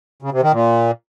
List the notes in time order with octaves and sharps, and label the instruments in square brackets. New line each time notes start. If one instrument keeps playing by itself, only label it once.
[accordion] C#3
C3
D#3
A#2